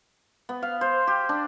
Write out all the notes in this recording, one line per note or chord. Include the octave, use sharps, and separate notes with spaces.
B3
F5
C5
G4
D4